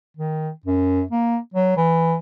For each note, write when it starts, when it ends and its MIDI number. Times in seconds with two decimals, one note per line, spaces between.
0.17 0.50 51
0.66 1.03 42
1.11 1.38 58
1.54 1.74 54
1.77 2.17 52